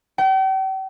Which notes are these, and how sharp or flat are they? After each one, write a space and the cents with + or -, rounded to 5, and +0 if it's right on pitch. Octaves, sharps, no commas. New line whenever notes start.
G5 -40